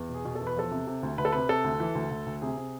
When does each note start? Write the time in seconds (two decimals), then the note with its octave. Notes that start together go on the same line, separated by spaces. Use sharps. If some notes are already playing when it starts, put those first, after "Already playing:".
Already playing: E2
0.09 B2
0.14 G#4
0.25 B2
0.35 A4
0.41 E2
0.47 B4
0.56 F3 A4
0.71 C3
0.87 C3
1.03 D2
1.18 D2 B4
1.25 A4
1.32 C3 B4
1.49 C3 A4
1.64 D2
1.80 E3
1.95 D2
2.11 D2
2.26 D2
2.42 C3 G#4
2.57 C3